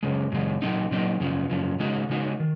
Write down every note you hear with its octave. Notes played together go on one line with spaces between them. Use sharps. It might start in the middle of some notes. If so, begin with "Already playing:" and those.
F#2 C#3 G#3
F#2 C#3 G#3
A#2 F#3 C4 D#4
A#2 F#3 C4 D#4
F#2 C#3 F3
F#2 C#3 F3
C#3 G#3 D#4 F#4
C#3 G#3 D#4 F#4
D#3